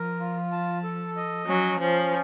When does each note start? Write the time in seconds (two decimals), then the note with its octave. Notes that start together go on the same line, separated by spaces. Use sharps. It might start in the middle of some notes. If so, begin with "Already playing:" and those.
Already playing: F3 A#4
0.20 F4
0.52 A5
0.84 A4
1.16 D#5
1.48 F#3 C#4
1.80 F3 C#4